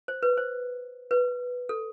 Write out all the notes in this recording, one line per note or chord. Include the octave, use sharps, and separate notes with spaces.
C5
B4
C5
B4
A4